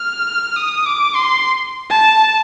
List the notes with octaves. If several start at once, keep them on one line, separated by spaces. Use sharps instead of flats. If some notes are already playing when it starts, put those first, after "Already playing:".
Already playing: F6
D#6
D6
C6
A5